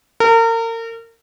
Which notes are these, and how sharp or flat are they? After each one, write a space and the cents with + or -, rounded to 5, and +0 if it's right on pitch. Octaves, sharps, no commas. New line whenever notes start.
A#4 -35